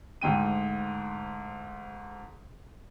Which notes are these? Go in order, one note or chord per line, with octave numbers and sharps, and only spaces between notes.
D2 G#2 G5 D#7